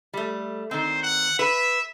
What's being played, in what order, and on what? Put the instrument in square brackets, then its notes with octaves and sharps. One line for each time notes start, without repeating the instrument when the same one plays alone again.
[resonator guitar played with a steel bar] G3 A3
[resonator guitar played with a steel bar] D#3 C4 [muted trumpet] C5
[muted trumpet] F#5
[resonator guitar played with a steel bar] B4 [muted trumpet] E5